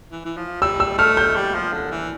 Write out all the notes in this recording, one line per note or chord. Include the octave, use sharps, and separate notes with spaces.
E3
E3
F3
G3 E6
E6
A3 F6
G6
G3
F3
D3
E3